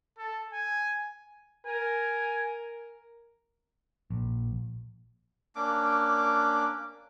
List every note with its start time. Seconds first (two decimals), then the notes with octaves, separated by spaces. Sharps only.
0.18 A4
0.53 G#5
1.65 A#4 G#5
4.10 A#1
5.56 A#3 C#4 D4 D6